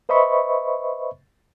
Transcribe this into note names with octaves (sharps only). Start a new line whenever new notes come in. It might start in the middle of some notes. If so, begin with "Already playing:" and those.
B4 C5 D#5 E5 B5 C#6